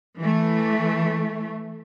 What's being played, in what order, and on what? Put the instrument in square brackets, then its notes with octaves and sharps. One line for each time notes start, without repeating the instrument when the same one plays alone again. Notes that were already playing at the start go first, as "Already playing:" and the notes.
[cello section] E3 A3